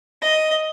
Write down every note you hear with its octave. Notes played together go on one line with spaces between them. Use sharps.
D#5